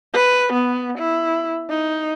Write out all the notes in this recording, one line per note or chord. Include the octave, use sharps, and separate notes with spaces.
B4
B3
E4
D#4